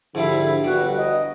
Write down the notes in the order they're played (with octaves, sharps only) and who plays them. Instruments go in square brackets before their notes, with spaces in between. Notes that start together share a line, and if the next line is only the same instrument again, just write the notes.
[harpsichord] G#2 F3 G3 [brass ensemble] D3 [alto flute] E4
[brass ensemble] G1 [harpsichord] G3 [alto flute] F#4
[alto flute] D#5